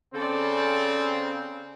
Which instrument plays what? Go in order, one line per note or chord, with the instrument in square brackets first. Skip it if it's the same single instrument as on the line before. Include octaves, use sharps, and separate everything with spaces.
[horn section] C#3 C4 [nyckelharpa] A4 D5